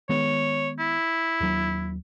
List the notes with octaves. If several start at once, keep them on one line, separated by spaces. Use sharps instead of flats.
D#3 G#3 B3 C#5
E4
D#2 F#3